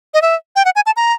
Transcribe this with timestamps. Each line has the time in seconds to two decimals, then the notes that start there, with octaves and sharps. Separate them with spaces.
0.14 D#5
0.22 E5
0.56 G5
0.65 F#5
0.76 G#5
0.86 A5
0.97 A#5